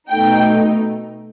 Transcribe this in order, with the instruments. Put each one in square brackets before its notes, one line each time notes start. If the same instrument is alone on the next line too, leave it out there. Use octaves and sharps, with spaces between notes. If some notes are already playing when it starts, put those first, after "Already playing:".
[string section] B2 A3 D#4 G5